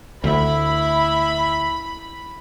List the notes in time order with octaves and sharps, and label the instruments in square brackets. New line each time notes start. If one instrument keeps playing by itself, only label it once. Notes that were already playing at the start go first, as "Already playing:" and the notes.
[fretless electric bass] D2 A3 [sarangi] E4 [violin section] B5